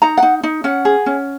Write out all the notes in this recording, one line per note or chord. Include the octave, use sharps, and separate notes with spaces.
D#4 A#5
F#5
D#4
D#4
C#4 F#5
G#4
C#4